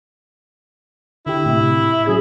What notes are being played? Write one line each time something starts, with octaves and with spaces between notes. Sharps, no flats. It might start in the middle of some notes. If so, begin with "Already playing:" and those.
D3 E4 G4
A2 C3 E5
E5
F#3 C#4 G#4 G#6